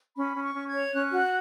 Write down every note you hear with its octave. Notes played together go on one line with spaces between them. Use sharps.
C#4 B5
C#4
C#6
C#4
G#6
C#5
C#4 F#6
F#4